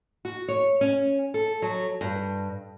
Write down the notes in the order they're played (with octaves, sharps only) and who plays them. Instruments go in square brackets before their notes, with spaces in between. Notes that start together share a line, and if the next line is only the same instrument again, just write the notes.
[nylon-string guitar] F#4
C#5
C#4
A4
F#3
G2